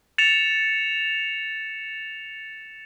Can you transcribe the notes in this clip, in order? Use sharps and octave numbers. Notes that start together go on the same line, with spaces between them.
A6 C#7 E7 F7